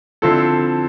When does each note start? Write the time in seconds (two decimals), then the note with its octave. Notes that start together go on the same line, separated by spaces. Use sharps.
0.22 D3 F3 C4 E4 A4